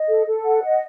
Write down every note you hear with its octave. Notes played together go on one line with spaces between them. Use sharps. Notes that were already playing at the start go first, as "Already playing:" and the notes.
Already playing: D#5
A4
A4
F#5
D#5